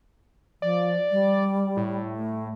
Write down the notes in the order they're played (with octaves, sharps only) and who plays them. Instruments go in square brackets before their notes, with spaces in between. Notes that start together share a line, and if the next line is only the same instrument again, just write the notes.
[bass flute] F3 [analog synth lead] D5
[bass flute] G3
[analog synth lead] A2
[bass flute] A3